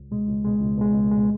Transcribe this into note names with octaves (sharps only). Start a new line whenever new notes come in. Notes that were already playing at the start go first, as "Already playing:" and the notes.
Already playing: C#2
B2 G#3
C#2
B2 G#3
C#2
B2 G#3
C#2
G#3
B2